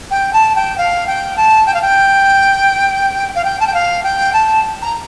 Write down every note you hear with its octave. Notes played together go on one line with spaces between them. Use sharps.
G5
A5
G5
F5
G5
A5
G5
F5
G5
F5
G5
A5
G5
F5
G5
A5
A#5